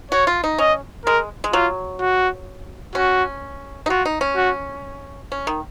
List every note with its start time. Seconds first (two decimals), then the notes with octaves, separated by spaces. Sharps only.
0.11 F#4 C#5
0.27 F4
0.44 D#4
0.58 C#4 D#5
1.06 G#3 A#4
1.44 G#3
1.53 F#3 F4
2.00 F#4
2.95 C#4 F#4
3.86 D#4
3.89 F4 F#4
4.05 D#4
4.21 C#4
4.36 F#4
5.32 C#4
5.47 D#3